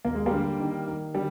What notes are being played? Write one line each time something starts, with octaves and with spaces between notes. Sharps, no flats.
D#2 A#3
G#3
G3 A#3
D3
D#3
D#3
D3 G3